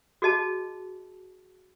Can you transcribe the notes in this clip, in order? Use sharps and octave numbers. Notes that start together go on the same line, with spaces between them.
F#4 G#4 D#5 A5